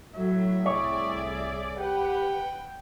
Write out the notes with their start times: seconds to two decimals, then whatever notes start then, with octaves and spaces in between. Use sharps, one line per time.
0.15 A2 F#3 E5
0.65 C2 G#4 C#5 D5
1.78 G4 B4 F#5 G5